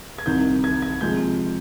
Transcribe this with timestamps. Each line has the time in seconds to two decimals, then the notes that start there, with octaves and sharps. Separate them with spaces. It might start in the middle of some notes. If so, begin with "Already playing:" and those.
0.18 G#6
0.26 C2 C3 D#3 G6
0.64 G#6
0.82 G#6
1.01 C3 F3 G#3 G6